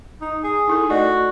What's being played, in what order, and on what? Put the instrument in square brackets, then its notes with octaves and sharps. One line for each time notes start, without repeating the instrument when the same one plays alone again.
[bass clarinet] D#4
G#4
[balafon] D#4 E4 A4
[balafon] A3 D5 D#5 [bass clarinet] F#4